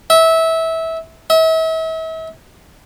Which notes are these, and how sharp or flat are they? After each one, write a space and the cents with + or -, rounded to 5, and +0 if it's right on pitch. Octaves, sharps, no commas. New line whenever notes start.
E5 -20
E5 -40